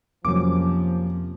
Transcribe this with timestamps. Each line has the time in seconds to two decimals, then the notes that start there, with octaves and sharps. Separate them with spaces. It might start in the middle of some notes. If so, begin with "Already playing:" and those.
0.25 F2 C3 F3 F#3 A#3 C#4 D6